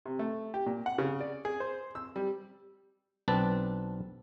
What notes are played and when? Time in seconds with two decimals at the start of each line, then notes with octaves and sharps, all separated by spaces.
0.06 C3
0.19 A3
0.54 G4
0.66 A#2
0.86 F#5
0.98 C#3
1.21 D5
1.45 G#4
1.60 C5
1.95 E6
2.16 G3
3.28 B1 C4 D4 B4 A5